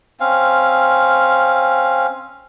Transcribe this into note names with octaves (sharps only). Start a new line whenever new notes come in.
C4 C#4 F5